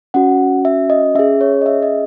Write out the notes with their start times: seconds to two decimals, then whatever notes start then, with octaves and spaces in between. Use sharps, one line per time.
0.14 C#4 F#4 F#5
0.65 E5
0.90 D#5
1.15 C#4 G#4 E5
1.41 C#5
1.61 D#5
1.66 E5
1.82 D#5